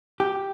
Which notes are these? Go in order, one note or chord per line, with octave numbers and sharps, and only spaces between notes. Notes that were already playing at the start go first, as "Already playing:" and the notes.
G4